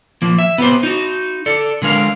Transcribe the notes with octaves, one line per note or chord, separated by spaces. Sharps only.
F3 A#3
E5
B3 G4 C5
D#4 F#4
A4 D5
D3 G#3 A#4 F5